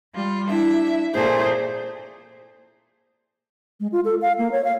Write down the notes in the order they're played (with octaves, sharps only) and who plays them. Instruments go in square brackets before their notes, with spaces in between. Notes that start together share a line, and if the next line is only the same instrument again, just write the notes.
[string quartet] G3 F4
[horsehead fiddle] D4 E4 [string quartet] E5
[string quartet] A#2 A3 [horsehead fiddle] G#4 C5
[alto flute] G#3
F4
A4
F5
A#3
C#5
F5